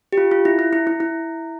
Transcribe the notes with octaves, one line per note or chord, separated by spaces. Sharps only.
G4
F4
F4
E4
E4
E4
E4
E4